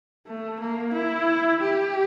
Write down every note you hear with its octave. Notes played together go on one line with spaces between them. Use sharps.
A3
A#3
E4
G4